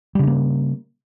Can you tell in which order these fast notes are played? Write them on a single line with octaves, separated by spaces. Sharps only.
G3 C#3 D4 A#3